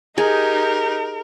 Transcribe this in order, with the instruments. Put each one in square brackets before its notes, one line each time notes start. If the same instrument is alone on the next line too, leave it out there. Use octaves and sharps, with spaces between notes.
[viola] D#4 G4 [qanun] G#4 [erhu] A#4